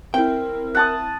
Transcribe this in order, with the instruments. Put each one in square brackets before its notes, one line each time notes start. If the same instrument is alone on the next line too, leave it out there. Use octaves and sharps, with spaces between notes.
[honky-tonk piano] C4 E4 [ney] A#4 [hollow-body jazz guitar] G5
[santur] F#5 A5 D#6